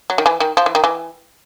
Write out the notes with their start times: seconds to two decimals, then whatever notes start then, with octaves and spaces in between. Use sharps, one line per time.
0.10 F#3
0.18 D#3
0.26 E3
0.40 D#3
0.57 F3
0.66 E3
0.75 D#3
0.84 E3